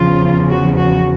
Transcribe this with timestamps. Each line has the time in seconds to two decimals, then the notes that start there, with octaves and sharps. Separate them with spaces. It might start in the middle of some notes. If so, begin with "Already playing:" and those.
Already playing: E2 C#3 F3 F4
0.49 F#4
0.76 F#4